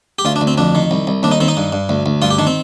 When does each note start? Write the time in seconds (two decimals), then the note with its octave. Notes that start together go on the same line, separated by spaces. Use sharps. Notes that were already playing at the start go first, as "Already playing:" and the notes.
0.19 G4
0.25 D2 F4
0.36 D4
0.41 D2
0.47 C4
0.58 F2 D4
0.75 D#3
0.91 C2
1.07 C2
1.23 D#2 D4
1.32 D#4
1.40 D#3 C4
1.48 D#4
1.57 G2
1.72 G2
1.89 D2
2.06 D2
2.22 G2 F4
2.30 G4
2.39 D#3 D4
2.47 C4